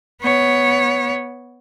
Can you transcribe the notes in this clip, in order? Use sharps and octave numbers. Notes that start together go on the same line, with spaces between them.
B3 C#5